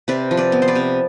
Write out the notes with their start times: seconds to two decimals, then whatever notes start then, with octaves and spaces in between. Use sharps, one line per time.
0.08 C3 B4 D5
0.31 F3
0.37 B4 D5
0.52 B3
0.62 C5
0.68 B4 D5
0.75 C3